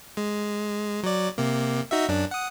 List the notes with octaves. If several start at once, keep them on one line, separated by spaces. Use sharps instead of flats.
G#3
F#3 D5
C3 A#3
D#4 F#4 E5
F#2 D4
F#5 D#6